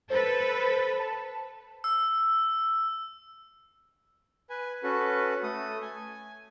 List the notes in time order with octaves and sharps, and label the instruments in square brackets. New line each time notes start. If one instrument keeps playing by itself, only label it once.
[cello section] A4 B4 [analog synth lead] C5
[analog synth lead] A5
[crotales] E6
[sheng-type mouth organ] B4 G#5
C#4 F#4 A4 B4
A3 A4 D#6
G#5